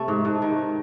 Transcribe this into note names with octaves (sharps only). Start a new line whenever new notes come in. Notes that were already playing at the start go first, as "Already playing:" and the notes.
Already playing: C3 A3
G#2
G#2
D#3